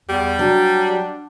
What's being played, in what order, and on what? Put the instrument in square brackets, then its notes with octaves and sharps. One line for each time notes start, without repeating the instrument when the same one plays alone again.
[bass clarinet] E2 [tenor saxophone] G3
[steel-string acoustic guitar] F#3 [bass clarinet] D4